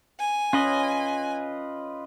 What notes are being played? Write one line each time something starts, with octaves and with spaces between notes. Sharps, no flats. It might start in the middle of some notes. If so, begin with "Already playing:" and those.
G#5
C#4 F4 B4 D#5